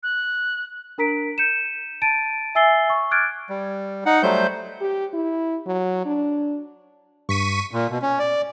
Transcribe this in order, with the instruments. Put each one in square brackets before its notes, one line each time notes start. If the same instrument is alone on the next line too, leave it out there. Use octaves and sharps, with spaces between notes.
[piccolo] F#6
[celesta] D4 A#4 A#5 B6 D7
G6 C#7 D#7 E7
A5 A6 D7 D#7
E5 G#5 E6 A6 C7 G7
C#6
D6 F6 F#6 G#6 A6 D7
[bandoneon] G3
D#4 F#5
F#3 G3 A3 C5 G6
[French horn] G4
E4
F#3
D4
[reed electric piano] G2 [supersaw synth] C#6 B6 D#7
[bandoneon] A#2
B2
C#4
D5